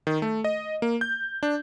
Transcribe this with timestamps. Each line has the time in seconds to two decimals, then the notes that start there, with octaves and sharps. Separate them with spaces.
0.07 D#3
0.22 A3
0.44 D#5
0.82 A#3
1.01 G6
1.43 D4